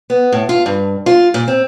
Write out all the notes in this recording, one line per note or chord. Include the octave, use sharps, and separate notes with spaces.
B3
A2
F4
G2
F4
A#2
C4